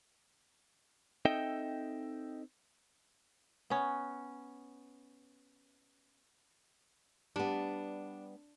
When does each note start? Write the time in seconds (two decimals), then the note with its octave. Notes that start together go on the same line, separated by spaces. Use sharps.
1.25 C4 D#4 A4 D#5 E5 G5
3.70 B3 C#4
7.36 G3 B3 D4